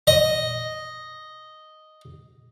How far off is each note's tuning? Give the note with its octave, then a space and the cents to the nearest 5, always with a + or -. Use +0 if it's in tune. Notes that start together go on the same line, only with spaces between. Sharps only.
D#5 +0